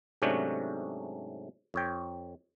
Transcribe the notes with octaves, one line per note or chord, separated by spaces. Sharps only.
G#2 C3 F#3 A3 C#4 D4
F2 C#5 G5